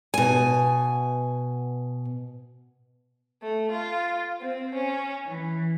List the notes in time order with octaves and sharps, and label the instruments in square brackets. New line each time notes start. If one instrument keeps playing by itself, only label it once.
[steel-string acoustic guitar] B2 G#5
[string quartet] A3
F4
C4
C#4
E3